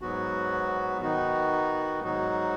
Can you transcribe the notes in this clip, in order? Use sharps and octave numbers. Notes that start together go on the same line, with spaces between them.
G#2 F#3 B3 F#4
D#3 B3 D#4 F#4
G#2 F#3 D#4 F#4